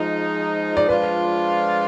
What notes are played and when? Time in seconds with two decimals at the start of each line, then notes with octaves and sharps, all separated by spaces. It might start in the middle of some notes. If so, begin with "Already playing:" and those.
Already playing: F3 G#3 D#4
0.77 D5
0.89 F3 G#3 D4 F4 B4